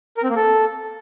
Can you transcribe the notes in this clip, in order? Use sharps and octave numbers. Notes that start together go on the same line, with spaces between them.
A#4
C4
A#3
A4